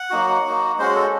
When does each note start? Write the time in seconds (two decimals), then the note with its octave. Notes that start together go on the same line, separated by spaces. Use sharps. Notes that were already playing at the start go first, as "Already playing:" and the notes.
Already playing: F#5
0.10 F#3 A#3 D#4 F#4
0.45 A#3 D#4 F#4
0.79 G#3 C#4 F#4 C5
0.95 A4